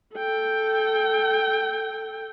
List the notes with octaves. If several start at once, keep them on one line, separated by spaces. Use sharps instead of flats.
A4 G5